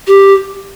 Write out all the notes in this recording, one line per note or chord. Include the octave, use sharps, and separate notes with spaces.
G4